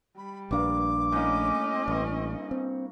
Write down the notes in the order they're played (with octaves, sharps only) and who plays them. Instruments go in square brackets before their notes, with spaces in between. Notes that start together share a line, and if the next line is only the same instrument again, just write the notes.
[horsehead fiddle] G3 [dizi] B5
[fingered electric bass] A#1 D4 [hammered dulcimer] G2 A#3 [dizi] D6
[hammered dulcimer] A2 A#3 [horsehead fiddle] C#4 D#5
[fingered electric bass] A1 [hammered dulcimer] G2 C#6
[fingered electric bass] C4